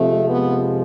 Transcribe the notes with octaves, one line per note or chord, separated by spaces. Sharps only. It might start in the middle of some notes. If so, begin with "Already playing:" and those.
Already playing: F2 C3 F3 G#3 A3
B3